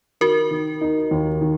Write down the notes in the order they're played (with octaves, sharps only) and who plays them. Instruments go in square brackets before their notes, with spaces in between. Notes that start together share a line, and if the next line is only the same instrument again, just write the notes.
[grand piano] D#3 [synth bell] F#4 A#4
[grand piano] D#3
D#4
D#2
D#3